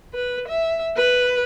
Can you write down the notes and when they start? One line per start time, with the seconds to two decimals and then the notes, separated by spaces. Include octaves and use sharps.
0.14 B4
0.48 E5
0.96 B4